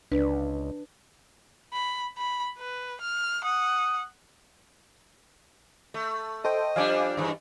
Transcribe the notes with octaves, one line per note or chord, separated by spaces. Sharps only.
C#2 D4 B4
B5
B5
B4
F6
F#5 D#6
A3
A4 C5 D#5 G5
F3 G3 D4 F5 G#5 D6
G2 E3